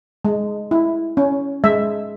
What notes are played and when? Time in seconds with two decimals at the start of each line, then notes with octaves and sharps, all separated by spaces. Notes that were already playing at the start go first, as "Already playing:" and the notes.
0.25 G#3
0.71 E4
1.17 C#4
1.64 G#3 E5